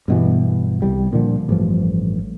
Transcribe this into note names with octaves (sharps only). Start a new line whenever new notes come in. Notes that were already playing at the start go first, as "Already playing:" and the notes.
G2 B2 E3
C2 G3
A#2 D3 F3
A1 G2 F3